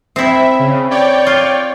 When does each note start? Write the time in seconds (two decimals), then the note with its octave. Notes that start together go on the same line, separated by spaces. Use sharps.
0.16 C4 E4 E5
0.59 C#3
0.91 C#5 D5 G5
1.27 F4